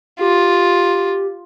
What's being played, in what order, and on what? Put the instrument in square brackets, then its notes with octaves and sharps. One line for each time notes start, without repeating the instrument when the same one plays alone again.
[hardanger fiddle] F4 [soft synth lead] G4